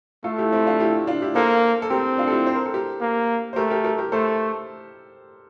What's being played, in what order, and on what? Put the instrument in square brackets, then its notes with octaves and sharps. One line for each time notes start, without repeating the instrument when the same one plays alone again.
[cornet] A3 [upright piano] F4 A4
[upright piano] E4 G4
C4 E4
D4 F4
E4 G4
D4 F4
E4 G4
[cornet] A#3 [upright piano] A4 C5
[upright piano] A4
[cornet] C4 [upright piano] G4 A#4
[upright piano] D4 F4
A4
E4 G4
C5
A#4
A4
G4 A#4
[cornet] A#3
[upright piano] C5
[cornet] A3 [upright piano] G4 A#4
[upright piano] G4 A#4
G4 A#4
G4 A#4
[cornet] A3 [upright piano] A4 C5